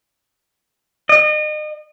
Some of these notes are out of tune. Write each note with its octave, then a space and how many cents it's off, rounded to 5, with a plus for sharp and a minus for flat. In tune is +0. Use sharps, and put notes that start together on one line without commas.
D#5 -35